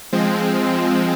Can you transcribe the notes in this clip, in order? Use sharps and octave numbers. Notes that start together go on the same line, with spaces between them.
F3 G#3 C4